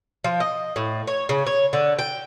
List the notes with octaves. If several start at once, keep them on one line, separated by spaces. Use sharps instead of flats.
F3
D#5
A2
C#5
C#3
C#5
D3
G5